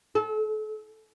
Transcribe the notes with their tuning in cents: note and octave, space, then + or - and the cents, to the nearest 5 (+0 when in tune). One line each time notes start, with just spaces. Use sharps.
A4 -35